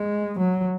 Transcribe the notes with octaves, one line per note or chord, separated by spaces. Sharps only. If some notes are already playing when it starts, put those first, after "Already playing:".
Already playing: G#3
F#3